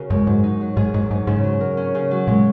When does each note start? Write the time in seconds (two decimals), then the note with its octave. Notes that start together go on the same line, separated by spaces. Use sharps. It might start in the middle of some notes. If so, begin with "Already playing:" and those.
Already playing: C#3 F#4 A#4
0.10 F#2 G#3
0.27 G#2 F#3
0.44 D#4
0.61 F#3
0.77 G#2 G#4
0.94 G#2 F#3
1.11 G#2 D#4
1.27 G#2 C#3
1.44 F#3
1.61 A#4
1.77 C#4
1.95 C#3
2.11 F#3
2.27 A#2 G#3